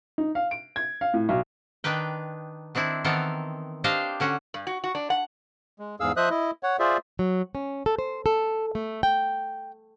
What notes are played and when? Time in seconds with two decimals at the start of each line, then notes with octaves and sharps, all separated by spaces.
0.18 D#4
0.35 F5
0.51 D7
0.76 G#6
1.01 F5
1.14 A2
1.29 B1
1.84 D#3 D4 B4 G5
2.75 D#3 C4 D4 E4
3.04 D#3 E3 B3 C4 A4 A#4
3.84 D4 G4 C5 D#5 F5 G5
4.20 D3 C#4 F#4
4.54 G2
4.67 F#4
4.84 F#4
4.95 D4
5.10 F#5
5.79 G#3
6.00 E2 G#2 G#4 F5 E6
6.17 F3 C5 D#5 E5 D#6 F#6
6.30 E4 D#5
6.63 C#5 F#5
6.79 F4 G#4 C5 D5 E5
7.19 F#3
7.55 C#4
7.86 A4
7.99 C5
8.26 A4
8.75 A3
9.03 G5